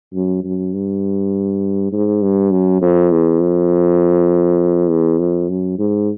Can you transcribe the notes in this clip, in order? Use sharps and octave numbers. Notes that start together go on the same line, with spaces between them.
F#2
F#2
G2
G#2
G2
F#2
F2
E2
F2
E2
F2
F#2
G#2